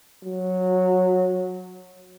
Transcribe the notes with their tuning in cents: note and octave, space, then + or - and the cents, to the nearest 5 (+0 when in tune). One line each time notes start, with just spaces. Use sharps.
F#3 -15